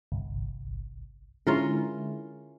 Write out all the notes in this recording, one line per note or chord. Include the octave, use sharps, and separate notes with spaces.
G1 C2
D3 G#3 C#4 E4 F4 A#4